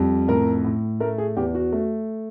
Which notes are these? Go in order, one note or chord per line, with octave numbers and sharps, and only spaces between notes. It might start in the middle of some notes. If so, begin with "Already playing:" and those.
Already playing: F2 G3
A2 A#4
A2
A3 A#4
G#4
E2 G4
F#4
A3